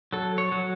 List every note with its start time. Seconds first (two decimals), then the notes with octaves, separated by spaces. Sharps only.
0.13 F#3 A4
0.38 C#5
0.52 F#3